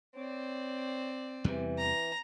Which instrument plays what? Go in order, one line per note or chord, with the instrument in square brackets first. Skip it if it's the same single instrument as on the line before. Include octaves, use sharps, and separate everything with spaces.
[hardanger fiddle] C4 D5 [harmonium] C#5
[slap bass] E2 C3 G3 [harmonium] E3
[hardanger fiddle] A#5